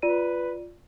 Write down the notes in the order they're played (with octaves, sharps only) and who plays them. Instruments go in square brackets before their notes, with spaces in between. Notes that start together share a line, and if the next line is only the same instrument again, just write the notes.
[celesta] F4 D5 D#7 [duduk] B4